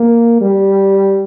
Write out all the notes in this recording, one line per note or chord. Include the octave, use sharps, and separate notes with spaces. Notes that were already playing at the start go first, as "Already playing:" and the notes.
Already playing: A#3
G3